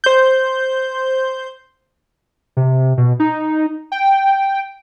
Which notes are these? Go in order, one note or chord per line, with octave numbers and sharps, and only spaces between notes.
C5 G6
C3
B2
D#4
G5